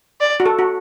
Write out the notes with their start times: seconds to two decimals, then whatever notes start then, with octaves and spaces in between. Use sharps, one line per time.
0.21 D5
0.40 F#4
0.46 A4
0.59 F#4